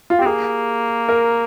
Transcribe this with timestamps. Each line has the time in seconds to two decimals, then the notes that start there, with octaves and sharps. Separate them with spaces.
0.10 F4
0.19 C4 G4
0.26 A#3 G#4
1.09 A#4